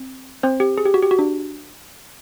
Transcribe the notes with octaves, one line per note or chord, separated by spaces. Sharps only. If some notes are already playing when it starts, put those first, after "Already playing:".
Already playing: C4
C4 C5
G4
G#4
G4
F#4
G4
F#4
D4